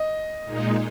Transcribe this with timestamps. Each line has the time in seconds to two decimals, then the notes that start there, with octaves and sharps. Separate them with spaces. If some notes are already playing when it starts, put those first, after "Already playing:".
Already playing: D#5
0.44 A#2 G#3 D#4